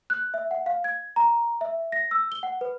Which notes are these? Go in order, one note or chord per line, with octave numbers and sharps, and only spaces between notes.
F#6
E5
F#5
F5
G#6
A#5
E5
A#6
E6
G7
F#5
B4